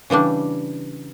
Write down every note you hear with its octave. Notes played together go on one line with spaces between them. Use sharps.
C#3 E3 G3 D4